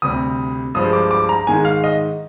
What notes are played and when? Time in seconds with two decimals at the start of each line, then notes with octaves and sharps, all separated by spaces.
0.02 D2 C3 G3 D#6
0.74 G2 F3 G#3 D#6
0.93 D6
1.11 D6
1.29 A#5
1.47 G#2 D#3 G#3 G#5
1.65 F5
1.84 D#5